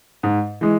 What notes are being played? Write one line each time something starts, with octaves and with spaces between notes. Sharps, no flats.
G#2
E3 G#3